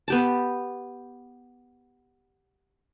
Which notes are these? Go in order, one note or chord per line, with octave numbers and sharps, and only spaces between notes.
B3 G4 A5